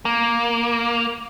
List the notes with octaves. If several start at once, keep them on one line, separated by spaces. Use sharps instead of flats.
A#3